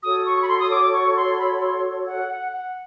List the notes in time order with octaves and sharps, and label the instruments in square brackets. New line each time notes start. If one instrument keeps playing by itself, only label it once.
[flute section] F#4 A4 C#5 [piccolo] D#6
[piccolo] C#6
B5
C6
D#6
D6
C#6
C6
B5
C6
F#5
F#5
F#5